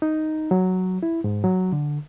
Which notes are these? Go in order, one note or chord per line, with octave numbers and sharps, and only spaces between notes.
D#4
F#3
E4
G#2
F#3
D3